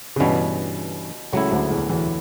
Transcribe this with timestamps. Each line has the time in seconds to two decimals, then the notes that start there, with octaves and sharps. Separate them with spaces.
0.16 C#3
0.20 G2 B2 E3 G3 C#4
1.33 C#2 C#3 F#3 A3 E4
1.51 D2 D3
1.71 E2 E3
1.89 E2 E3